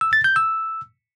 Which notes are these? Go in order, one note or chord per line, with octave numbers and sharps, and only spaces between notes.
E6
A6
G6
E6